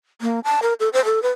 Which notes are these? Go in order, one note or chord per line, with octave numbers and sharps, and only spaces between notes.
A#3
A5
A#4
A4
C5
A4
B4